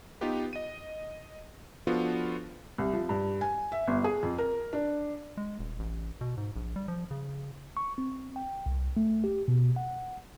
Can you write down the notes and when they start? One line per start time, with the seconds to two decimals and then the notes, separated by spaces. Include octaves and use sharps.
0.21 B3 D#4 F4 G4 B4
0.53 D#5 D#7
1.87 F3 B3 D4 F4 F#4 A4
2.78 C2
2.93 F3
3.09 G2
3.41 G#5
3.72 E5
3.88 G1
4.04 G#4
4.23 F2
4.38 A#4
4.73 D4
5.37 G#3
5.59 D#1
5.79 A1
6.21 B2
6.37 G#2
6.56 A#1
6.76 G3
6.88 F3
7.11 C#3
7.77 C#6
7.98 C4
8.36 G5
8.66 C2
8.97 A3
9.24 G4
9.48 B2
9.76 F#5